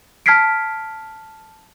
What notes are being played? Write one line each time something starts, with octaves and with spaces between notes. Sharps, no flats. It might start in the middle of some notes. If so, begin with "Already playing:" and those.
A5 F6 G#6 B6 C7 D7